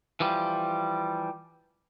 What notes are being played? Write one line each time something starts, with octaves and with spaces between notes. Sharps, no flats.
E3 F3 G3